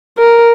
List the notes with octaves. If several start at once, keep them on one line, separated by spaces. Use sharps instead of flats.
A#4